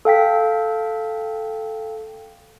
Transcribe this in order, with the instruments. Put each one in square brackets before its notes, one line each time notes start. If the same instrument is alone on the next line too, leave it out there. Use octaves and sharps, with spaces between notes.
[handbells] A4 F5 G5 B6